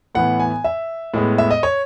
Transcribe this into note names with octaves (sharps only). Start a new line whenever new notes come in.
A2 E3 B3 F#5
G#5
E5
A2 G#3 B3
E5
D#5
C#5